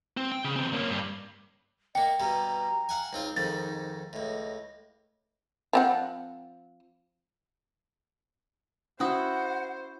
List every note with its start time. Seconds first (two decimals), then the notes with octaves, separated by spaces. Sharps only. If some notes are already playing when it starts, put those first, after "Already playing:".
0.17 C4
0.32 G5
0.44 C#3
0.56 E2 C4
0.73 A#3 C#4
0.90 G2
1.95 A#3 D4 D#5 G5
2.20 G2 B2 G3 A#5
2.89 F5 F#5 G#5
3.13 C#2 C4 D#4 F4
3.36 F2 G#2 D#3 A6
4.13 C#2 A2 D#5
5.73 F3 C4 F#5
9.00 C#4 E4 F#4 C5 F#5 D#6